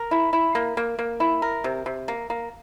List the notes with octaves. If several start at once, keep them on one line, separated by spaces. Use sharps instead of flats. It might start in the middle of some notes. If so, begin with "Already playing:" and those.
Already playing: A#4
E4
E4
A#3
A#3
A#3
E4
A#4
C3
C3
A#3
A#3